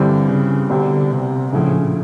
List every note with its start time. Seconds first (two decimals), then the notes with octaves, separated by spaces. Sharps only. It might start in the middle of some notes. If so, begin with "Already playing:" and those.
Already playing: G2 D3 E3 G3 C4
0.28 C#3
0.70 C2 B2 D3 G3 C4
1.11 C3
1.52 A#1 A2 C#3 F3